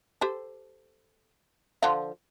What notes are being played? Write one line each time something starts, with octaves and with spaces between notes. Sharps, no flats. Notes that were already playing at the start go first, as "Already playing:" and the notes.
G4 A4 C5
D3 F3 F4